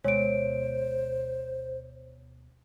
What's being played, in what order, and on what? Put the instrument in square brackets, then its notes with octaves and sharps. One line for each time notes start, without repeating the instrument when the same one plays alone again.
[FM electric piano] D2 B2 [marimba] G#3 [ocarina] C5 [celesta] C#5 D7